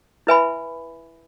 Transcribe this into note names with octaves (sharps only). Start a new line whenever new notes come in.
E4 B4 E5 G#5 B5